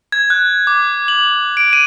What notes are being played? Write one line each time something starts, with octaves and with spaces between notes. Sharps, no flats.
G#6
F#6
D6
F#7
D7
D#7